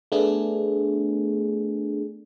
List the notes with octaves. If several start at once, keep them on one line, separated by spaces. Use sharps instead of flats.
A3 B3 D4 G#4